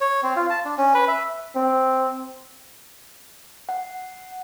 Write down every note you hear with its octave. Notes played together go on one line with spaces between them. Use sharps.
C#5
C4
F4
A5
D4
C#4
B4
E5
C4
F#5